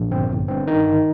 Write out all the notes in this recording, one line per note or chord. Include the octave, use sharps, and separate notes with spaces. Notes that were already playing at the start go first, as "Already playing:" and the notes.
Already playing: A#1
G1 C4
G1
G2 C4
D#3 D#4
G1